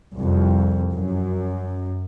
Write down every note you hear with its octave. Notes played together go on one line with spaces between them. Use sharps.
C2 F2
F#2